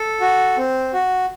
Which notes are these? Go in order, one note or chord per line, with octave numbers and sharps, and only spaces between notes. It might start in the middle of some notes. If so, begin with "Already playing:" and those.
Already playing: A4
F#4
C4
F#4